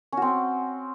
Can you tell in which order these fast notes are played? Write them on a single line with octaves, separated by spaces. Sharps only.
C#4 F#4 C4